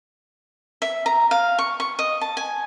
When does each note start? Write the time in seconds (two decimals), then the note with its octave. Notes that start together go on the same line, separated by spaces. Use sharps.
0.82 E5
1.06 A#5
1.31 F5
1.59 C#6
1.80 C#6
1.99 D#5
2.21 A5
2.37 G#5